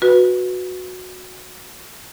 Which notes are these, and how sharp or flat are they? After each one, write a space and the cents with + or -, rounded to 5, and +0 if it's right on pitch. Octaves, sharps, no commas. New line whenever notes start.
F#4 -15 B4 +0